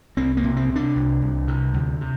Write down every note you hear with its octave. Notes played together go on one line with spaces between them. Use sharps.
C2 C4
A#3
C3
C4
C3
D4
C2
C2
C3
D2
C3